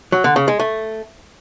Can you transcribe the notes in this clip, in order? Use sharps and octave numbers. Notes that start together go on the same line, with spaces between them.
F#3
D3
C#3
G#3
A3